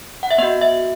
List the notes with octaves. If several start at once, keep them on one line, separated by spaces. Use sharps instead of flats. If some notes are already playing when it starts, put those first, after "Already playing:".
F#5
E5
B3 F#4 D#5
E5